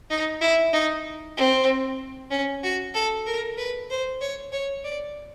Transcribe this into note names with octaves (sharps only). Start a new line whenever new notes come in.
D#4
E4
D#4
C4
C#4
F#4
A4
A#4
B4
C5
C#5
C#5
D5